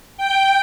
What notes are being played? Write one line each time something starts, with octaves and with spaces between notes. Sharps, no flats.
G5